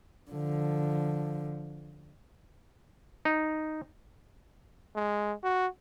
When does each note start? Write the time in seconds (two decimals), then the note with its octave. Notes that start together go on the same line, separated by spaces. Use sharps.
0.31 D3 F3
3.25 D#4
4.96 G#3
5.43 F#4